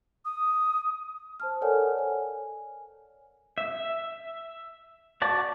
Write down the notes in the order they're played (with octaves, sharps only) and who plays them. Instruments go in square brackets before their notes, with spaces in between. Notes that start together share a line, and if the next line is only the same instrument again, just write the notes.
[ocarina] D#6
[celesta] C5 A5 F6
A4 A#4 C#5 D5 F#5 G#5
G#5
[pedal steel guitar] E5
F#4 D5 A5